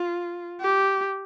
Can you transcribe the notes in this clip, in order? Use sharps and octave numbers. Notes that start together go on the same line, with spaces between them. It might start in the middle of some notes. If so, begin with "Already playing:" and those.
Already playing: F4
G4